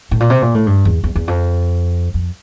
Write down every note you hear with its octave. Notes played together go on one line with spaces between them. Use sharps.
A2
A#2
C3
A#2
A2
G2
E2
E2
E2
F2
F2